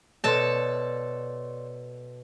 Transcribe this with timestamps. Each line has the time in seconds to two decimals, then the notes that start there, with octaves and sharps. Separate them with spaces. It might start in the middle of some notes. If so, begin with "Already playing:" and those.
0.24 B2 A4 C#5 D5 A5 C6